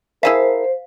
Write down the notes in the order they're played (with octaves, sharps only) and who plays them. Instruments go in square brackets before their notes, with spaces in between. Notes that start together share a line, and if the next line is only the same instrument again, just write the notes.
[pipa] E4 G#4 A5 [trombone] A#4 [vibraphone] C5 [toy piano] F5